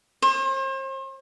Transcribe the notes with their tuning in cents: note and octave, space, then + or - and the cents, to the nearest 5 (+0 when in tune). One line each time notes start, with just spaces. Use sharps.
C5 +40